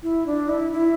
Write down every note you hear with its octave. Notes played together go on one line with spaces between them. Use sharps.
E4
D4
E4
E4